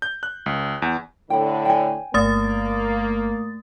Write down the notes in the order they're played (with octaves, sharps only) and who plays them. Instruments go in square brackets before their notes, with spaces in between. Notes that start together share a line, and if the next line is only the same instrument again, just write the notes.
[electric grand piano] G6
F#6
C#2
E2
[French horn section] A2 D3 [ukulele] G5 B5
[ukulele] G5 G#5
[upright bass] G1 [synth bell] A3 D#6 A6 [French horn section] A#3